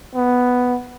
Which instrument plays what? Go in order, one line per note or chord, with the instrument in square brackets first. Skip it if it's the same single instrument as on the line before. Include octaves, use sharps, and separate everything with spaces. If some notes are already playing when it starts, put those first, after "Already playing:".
[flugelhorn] B3